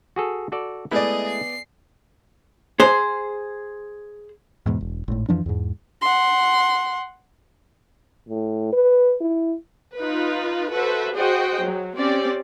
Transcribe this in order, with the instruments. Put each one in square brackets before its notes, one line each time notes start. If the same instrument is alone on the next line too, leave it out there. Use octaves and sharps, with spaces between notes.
[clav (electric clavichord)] F#4 G#4 A4
F#4 A4 D5
[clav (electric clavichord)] G#3 A3 E4 [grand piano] B3 D5 [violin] G#4 D#5
[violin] C7
[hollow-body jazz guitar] G#4 C5
[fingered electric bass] E2 G#2 B2
E1
G#1 A2
F2 E3 F3 D4
E2 G#2
[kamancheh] F#5 C6
[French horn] A2
B4
E4
[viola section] D#4 F4 B4
F#4 A4 B4 C5 E5
F#4 G#4 C5 D#5 G5
F#3
C4 C#4 G4 D5